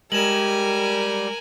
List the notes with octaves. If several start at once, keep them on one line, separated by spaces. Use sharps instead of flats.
G3 G#3 A#4 G#5 E7 F#7